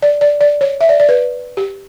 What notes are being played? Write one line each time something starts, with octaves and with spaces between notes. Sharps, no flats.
D5
D5
D5
C#5
E5
D5
D5
B4
G4